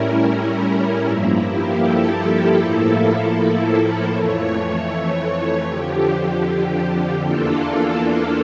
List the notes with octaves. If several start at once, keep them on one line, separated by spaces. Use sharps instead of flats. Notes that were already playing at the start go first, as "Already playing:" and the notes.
Already playing: A2 G3 C#4 E4 A#4
G2 F3 A#3 E4
G4
A4
A2 F3 A#3 E4 A4
F2 E3 A3 C#5
F2 D3 F3 G4
E2 E3 A#3 D4 F4 A4